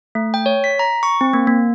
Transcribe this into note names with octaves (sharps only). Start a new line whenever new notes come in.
A3
G5
C#5
B6
A#5
C#6
C4
A#3
A#3